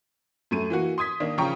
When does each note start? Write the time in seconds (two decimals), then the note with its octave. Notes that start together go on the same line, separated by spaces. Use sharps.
0.51 F#2 A3 D#7
0.70 E3 A#3 F#4
0.98 C6 D#6 G#6 B6
1.20 D#3 A#3 D4
1.38 C#3 F3 G5 A#5 C#6